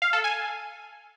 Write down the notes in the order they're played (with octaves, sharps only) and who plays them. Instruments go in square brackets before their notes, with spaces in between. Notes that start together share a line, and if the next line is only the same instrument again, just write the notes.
[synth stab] F5
A4
G#5